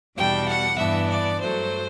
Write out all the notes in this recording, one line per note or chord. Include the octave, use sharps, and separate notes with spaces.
E2 B2 G3 D4 G5
F#5
G2 E3 B3 D4 E5
D5
G2 F#3 A3 C5